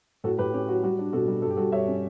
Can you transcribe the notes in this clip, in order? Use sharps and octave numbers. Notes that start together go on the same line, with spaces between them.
A2 F#4 A4
A2 G4 B4
C#4 G4
F#3 F#4
G3 F#4
D4
B2 F#4 A4
G3
G2 A4
G4
G2 F#4 A4
G2 C#5 E5
C#4